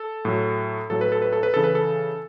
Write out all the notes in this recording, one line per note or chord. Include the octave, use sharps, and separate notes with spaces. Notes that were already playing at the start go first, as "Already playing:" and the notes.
Already playing: A4
A2 F#3
A2 F#3 A4
B4
A4
B4
A4
B4
C#3 E3 A4
B4
A4